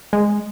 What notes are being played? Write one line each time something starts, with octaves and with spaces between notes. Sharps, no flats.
G#3